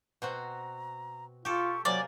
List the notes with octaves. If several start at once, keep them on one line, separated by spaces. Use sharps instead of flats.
B2 C4 F#4 A#5
F4 G4 A4 C#6
C3 F#3 A#3 D5 G#5